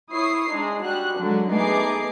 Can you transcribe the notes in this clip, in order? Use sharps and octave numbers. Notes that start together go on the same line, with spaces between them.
E4 C#5 D#6 C7
G#3 D4 D#4
G3 F#4 F#6
D3 F#3 G#3
A3 B3 D#4 G#4 D6 C7